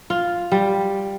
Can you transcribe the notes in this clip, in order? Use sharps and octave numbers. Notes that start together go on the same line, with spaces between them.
F4
G3